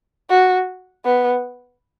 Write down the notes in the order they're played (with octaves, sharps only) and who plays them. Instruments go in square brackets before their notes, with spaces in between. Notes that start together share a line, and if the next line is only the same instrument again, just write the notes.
[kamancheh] F#4
B3